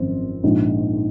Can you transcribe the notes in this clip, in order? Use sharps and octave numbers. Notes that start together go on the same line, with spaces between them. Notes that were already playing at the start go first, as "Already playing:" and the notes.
Already playing: G#1 F#2 F3 C4
A#1 G#2 F3